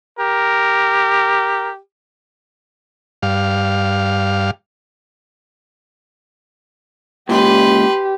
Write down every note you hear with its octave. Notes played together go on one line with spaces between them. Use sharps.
G4 A#4
G2 F5
C#2 A#2 G4 B4 C6